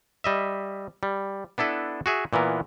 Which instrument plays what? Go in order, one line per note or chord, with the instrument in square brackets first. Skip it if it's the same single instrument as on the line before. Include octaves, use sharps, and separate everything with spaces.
[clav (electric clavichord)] G3 D#5 E5
G3
B3 D4 E4 A4 B4
F#4 G#4 E5
A#2 E3 B3 A#4